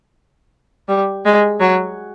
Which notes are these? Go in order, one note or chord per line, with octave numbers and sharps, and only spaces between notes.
G3
G#3
F#3